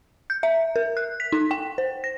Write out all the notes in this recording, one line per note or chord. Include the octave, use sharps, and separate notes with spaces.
G6
E5
A#4
F#6
B6
D#4
G5
C5
A#6